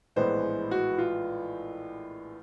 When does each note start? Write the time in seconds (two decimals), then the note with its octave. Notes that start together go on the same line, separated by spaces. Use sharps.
0.16 A#1 A2 E3 G#3 B3 C5
0.71 F#4
0.98 F4